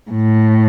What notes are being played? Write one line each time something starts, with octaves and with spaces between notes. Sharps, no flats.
A2